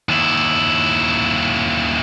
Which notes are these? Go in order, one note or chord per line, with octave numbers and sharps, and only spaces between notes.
D#2 E4